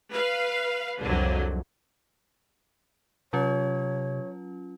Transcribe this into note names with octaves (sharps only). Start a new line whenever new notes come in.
B4 F5
C2 F2 D3 F3 F#3
C3 F#3 C#4 F4 C#5